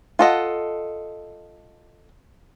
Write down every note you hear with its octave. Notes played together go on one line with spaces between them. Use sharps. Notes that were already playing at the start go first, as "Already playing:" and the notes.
F4 A4 D#5 F#5